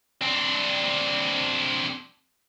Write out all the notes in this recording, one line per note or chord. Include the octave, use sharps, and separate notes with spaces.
C4 D4